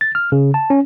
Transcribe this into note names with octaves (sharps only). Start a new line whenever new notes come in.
A6
F6
C#3
A5
C#4